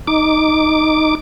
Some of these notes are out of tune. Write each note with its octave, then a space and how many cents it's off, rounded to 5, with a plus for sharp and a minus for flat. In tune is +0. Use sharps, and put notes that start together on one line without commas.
D#4 +0 D6 +0